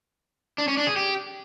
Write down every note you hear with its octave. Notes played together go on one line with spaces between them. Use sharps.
D4
C#4
D4
G#4
G4